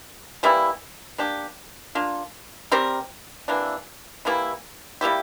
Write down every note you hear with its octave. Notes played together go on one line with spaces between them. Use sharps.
E3 G3 A#3 E4
A#3 D4 G4
A#3 D4 F4
G3 C4 G4 A#4
C3 E3 A#3 D4
E3 G3 A#3 E4
G3 A#3 E4 G4